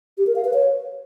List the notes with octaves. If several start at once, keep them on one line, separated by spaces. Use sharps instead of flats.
G4
A#4
F5
B4
C#5